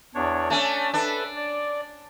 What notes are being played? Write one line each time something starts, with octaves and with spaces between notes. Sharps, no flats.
E2 D4 C#5
A3 C#4 D4
D4 A4 B4 E5
D5